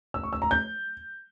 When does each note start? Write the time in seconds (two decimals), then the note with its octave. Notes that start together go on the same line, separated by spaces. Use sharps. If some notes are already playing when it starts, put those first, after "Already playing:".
0.14 E6
0.23 C#6
0.33 E6
0.42 A#5
0.51 G6